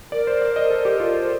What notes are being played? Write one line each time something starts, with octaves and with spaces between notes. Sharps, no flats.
A#4 D5
C5
D5
D#5
A4
G4
F4
A4
C5